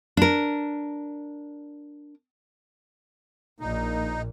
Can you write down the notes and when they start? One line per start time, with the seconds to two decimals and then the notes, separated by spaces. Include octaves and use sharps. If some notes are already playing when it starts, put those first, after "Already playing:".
0.17 D4 A#4
3.60 A#1 A#2 D#4